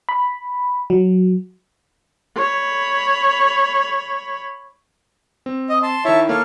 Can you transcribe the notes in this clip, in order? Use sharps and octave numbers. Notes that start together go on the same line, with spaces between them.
B5
F#3
C#5 B5
C4
D#5
A5 C6
D#3 E4 C#5 E5 A5
A#3 A4 C#5 F5